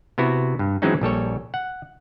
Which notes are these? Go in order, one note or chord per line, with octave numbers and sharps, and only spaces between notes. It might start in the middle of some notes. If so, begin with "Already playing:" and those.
C3 B3 E4 F#4
G2
E3 F#3 G#3 C4 C#4 D#4
A#1 G3 A4 C#5
F#5